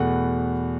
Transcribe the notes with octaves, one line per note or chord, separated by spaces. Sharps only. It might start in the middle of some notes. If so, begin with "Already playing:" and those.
Already playing: E2 B2 A3 F#5